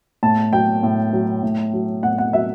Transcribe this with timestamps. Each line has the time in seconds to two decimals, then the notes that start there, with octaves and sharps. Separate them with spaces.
0.23 A2 A5
0.52 F#3 G5
0.83 A2
1.13 F#3
1.43 A2
1.73 F#3
2.03 A2 F#5
2.18 F#5
2.33 F#3 E5